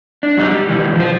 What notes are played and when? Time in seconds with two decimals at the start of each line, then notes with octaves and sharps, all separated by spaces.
0.23 D4
0.37 F#2 B2 G3 D#4
0.51 G3
0.69 B2 D#3 E3
0.96 F3 C5